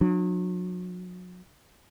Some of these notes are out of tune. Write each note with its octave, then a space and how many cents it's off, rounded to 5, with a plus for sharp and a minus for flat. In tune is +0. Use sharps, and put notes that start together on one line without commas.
F#3 -35 D4 +30